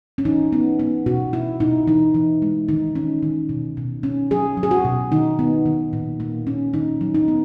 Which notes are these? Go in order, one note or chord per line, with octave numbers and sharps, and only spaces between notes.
C#4
E3 D#4
B3
B3
B2 F#4
B2 E4
B2 D#4
E3 D#4
E3
G#3
D#3 D#4
C#4
D#3
B2
B2
C#4
F#3 G#4
F#3
G#4
F#4
B2
D#3 D#4
B3
D#3
A#2
A#3
C#4
D#3 D#4
F#3
D#4
B3